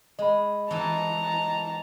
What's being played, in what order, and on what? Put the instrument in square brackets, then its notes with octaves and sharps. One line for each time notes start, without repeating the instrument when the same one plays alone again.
[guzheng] G#3 [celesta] D#5 B5
[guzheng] E3 D#4 [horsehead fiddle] A5 A#5